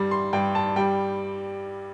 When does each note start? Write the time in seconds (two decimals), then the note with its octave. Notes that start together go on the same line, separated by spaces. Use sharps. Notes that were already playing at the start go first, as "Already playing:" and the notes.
Already playing: G2 G3
0.11 C6
0.33 G2 G5
0.55 A5
0.76 G3 G5